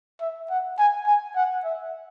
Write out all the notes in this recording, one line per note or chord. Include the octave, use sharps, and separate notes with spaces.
E5
F#5
G#5
G#5
F#5
E5